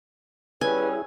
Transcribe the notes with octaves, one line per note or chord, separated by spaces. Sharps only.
G3 C#4 E4 G#4 B4 G#5